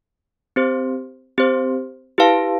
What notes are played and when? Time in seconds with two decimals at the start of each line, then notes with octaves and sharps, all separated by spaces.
0.56 C4 G4 C5
1.38 C4 G4 C5
2.18 E4 G4 B4 F5 A5